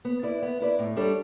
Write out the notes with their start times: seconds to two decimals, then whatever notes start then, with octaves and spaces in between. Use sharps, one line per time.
0.05 B3
0.23 E4 B4 D5
0.42 B3
0.60 E4 B4 D5
0.79 A2
0.96 G3 D4 A4 C#5